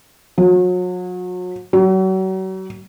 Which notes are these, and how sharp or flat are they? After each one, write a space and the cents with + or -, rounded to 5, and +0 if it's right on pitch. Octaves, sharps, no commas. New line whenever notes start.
F#3 -35
F#3 +35